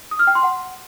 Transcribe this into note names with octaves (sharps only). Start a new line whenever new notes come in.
D#6
F6
G5
C6
F#5